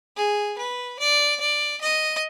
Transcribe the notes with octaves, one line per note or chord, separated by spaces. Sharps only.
G#4
B4
D5
D5
D#5